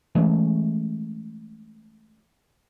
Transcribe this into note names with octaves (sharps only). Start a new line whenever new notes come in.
E3 G#3 A3 C#4